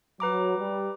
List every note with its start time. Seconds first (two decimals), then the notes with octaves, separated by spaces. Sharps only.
0.20 F#3 B4 A#5 D6
0.57 G3